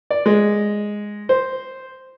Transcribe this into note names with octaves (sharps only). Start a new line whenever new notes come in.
D5
G#3
C5